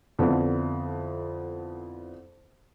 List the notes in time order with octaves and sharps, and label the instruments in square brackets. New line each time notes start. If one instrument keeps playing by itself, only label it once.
[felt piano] F2 D3 B3 E4